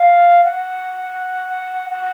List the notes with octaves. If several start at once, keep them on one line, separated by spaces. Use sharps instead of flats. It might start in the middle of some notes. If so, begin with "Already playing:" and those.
Already playing: F5
F#5
F#5